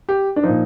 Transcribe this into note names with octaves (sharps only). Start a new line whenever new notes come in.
G4
D4
A#2 F3 D#4